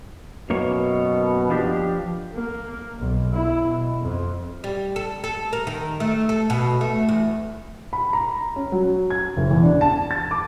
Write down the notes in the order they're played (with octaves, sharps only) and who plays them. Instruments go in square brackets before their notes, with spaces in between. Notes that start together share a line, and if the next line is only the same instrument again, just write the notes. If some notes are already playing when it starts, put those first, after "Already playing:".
[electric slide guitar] F#2 A#3 C#5 [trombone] B2
[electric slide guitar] F3 D4 G4
[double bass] A#3
B1
E4
B2
F2
[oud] G3
A4
A4
A#4
D#3
A3
A4
B2
A3
E2
[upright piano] B5
A#5
C#4
F#3
G#6
F#1
E2
D4
A5
A6
D6